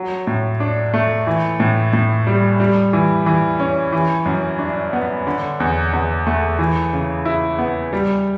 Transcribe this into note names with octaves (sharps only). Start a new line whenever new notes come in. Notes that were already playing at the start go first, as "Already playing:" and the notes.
Already playing: F#3
A2
D4
A3
E3
A2
A2
G3
G3
E3
E3
C#4
E3
F#2
D4
B3
D3
E2
E2
A3
E3
C#3
E4
B3
G3